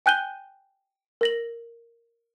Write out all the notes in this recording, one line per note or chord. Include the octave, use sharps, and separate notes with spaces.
G5 G#5 F#6 G6 D#7 G7
A#4 A#6 F#7